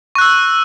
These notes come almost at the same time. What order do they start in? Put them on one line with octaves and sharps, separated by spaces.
C#6 F#6 E6